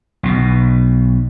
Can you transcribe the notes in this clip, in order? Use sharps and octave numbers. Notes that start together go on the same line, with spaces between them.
B1 B2